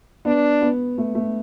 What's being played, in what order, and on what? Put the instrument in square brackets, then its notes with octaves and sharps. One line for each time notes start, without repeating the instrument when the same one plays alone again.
[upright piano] B3 [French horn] D4
[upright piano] B3
A3
A3